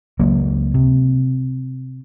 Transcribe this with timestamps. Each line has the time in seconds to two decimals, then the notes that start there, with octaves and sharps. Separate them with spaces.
0.19 C#2 F#3 A#3
0.74 C3